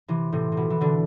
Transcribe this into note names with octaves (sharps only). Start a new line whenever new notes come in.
C3 E3
A2 C3
C3
B2
E3
B2 D3